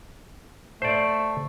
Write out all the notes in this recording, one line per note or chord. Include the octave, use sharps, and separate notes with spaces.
A3 C5 D5